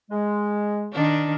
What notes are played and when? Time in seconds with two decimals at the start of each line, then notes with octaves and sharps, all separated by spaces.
0.11 G#3
0.93 D#3 D4